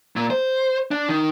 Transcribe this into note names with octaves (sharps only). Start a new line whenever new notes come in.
A#2
C5
D4
D#3